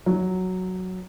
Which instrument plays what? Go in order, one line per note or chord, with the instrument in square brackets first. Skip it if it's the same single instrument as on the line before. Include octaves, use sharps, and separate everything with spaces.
[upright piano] F#3